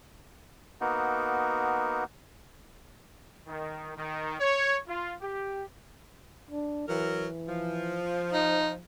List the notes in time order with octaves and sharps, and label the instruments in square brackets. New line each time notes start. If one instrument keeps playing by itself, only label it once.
[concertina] A#3 B3 D#4 F#4
[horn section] D#3
D#3
C#5
F4
G4
[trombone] D4
[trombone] E3 [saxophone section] F#3 A#4
[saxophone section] F3
[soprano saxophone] D#4